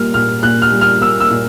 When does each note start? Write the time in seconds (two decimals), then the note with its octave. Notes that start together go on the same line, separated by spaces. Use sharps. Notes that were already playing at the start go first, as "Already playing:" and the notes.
Already playing: A#2 G3 A#3 F6
0.14 A#2 F6
0.42 A#2 F#6
0.62 F6
0.72 G3
0.81 F6
1.01 A#3 E6
1.20 E6
1.31 A#2